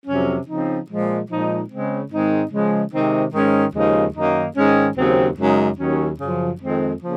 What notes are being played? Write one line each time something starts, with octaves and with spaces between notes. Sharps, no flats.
F2 C3 F#3 C#4
C#3 F3 C4 D#4
A#2 F3 G#3
A#2 F3 G#3 D#4
C#3 G#3 C4
G#2 D#3 G#3 C4 D#4
C#3 F3 G#3
C3 D#3 G#3 C4 D#4
G#2 D#3 G#3 C#4
D#2 C#3 F3 G#3 D#4
F#2 D#3 A#3 D#4
G#2 D#3 G#3 C#4
D#2 C#3 F#3 C4
F#2 C#3 G#3 D#4
D#2 D#3 F#3 C#4
F#2 C#3 F3
F2 D#3 G#3 C4
C#3 F3 A#3